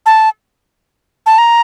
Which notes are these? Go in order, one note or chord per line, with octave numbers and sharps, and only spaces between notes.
A5
A5
A#5